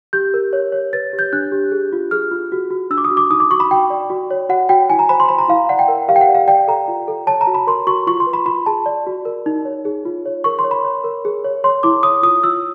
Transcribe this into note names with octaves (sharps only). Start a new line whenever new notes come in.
G4 G6
A#4
C#5
C#5
B4 A6
G4
G6
D4 F#6
G4
G#4
F4
G#4 F6
F4
F#4
F#4
D4 E6
D6
D#6
F#4
D6
D#4 D#6
D6
F#4 C#6
B5
F#4 G5
D5
F#4
C#5
F#4 F#5
F#4 G5
E4 G#5
A#5
C5 B5
C6
C5 B5
A#5
E4 F5
D5 F#5
G5
A#4
G4 F5
G5
F#5
D5
F5
D5 G5
A4 A#5
F4
A4
C#5 A5
A#5
F#4
B5
A#4 C6
F#4 C#6
F4 C#6
C6
B4
B5
F4 B5
G#4 A5
D5
F#4
A#4
D#4
C#5
G#4
F4
C#5
A#4 C#6
C6
C#5
B5
C#5
A#4
G#4
C#5
C#5 C6
E4 D6
C#5 D#6
F4 D#6
F4 E6